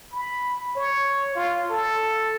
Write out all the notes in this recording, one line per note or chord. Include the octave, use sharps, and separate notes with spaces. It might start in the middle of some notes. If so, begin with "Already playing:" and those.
B5
C#5
F4
A4